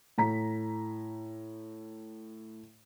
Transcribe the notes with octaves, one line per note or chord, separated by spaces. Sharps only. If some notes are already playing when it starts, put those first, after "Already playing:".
A2 A#5 B6